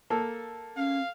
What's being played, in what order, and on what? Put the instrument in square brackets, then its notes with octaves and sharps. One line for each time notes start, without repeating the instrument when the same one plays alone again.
[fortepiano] A#3 A4
[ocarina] C#4 [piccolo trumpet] F5